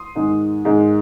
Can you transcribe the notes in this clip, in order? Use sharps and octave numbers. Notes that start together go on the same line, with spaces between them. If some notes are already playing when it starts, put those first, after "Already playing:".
Already playing: C6 D#6
G#2 D#3 G#3
G#2 D#3 G#3